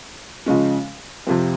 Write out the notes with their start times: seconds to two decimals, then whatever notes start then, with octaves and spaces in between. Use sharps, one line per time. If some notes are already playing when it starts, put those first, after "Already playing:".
0.46 C#3 F3 G#3 C#4
1.27 F2 C3 F3 C4